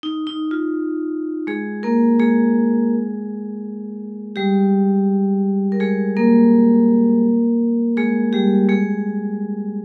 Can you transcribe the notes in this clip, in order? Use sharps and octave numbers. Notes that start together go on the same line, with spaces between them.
D#4
D#4
F4
G#3 G#4
A#3 A#4
G#3 G#4
G3 G4
A#4
G#3 G#4
A#3 A#4
G#3 G#4
G3 G4
G#3 G#4